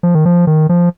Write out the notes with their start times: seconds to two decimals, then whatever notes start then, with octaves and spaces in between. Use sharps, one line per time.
0.03 F3
0.15 D#3
0.25 F3
0.47 D#3
0.69 F3